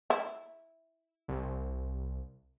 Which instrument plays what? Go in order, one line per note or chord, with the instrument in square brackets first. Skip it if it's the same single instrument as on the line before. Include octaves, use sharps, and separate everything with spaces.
[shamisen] E4
[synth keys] C2